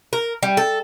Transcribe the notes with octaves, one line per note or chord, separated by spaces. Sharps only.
A#4
G3
A4